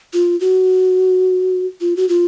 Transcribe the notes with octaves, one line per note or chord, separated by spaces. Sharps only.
F4
F#4
F4
F#4
F4